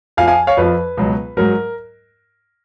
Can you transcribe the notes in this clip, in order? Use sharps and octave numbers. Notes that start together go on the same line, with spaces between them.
F2 F3 F5 G#5
F5 G#5
C#5 F5
F2 F3 B4
C#2 B2 F#3
G#2 F#3 A#4